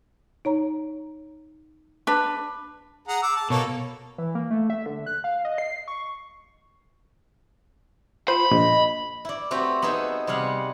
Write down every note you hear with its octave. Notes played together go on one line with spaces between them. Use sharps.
D#4 C#5 A#5
D4 B4
G#4 F#5 A#5
D6 E6
A5
B2 A#3 A4 C#5
E3
A#3
A3
E5
D3
F#6
F5
D#5
C7
C#6
F4 C5 B5
A#1 D#5
E4 D5
A3 C4 F#4 G4 B4
B3 D#4 G#4 A4 E5
C3 G3 G#4 F5 F#5